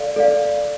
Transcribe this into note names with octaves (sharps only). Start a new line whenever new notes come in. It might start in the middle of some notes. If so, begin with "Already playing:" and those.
Already playing: A4 D5 F5
A4 D5 F5